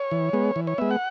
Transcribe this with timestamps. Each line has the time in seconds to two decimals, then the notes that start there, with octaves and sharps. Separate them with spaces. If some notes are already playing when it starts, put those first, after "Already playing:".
Already playing: C#5
0.11 E3
0.33 G#3 B3
0.56 E3
0.67 C#5
0.78 G#3 B3 E5
0.91 F#5